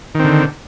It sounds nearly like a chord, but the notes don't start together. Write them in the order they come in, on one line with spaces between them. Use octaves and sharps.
D#3 C4 D3